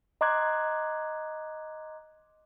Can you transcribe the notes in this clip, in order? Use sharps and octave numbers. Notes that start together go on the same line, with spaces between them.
D#5 A#5 C6 D6 F#6 G#6